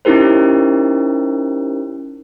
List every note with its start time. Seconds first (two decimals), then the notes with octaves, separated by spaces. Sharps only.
0.05 C#4 D#4 E4 G4 A#4 C5